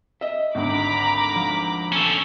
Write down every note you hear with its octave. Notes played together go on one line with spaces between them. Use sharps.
D#5 E5
G#1 D2 A#5 B5 D6
F3
C#4 A4